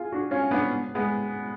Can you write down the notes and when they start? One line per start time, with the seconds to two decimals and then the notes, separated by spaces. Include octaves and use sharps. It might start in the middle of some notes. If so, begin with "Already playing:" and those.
Already playing: F4 G#4
0.12 D4 F#4
0.31 C#4 F4
0.51 B3 D4
0.95 G#3 B3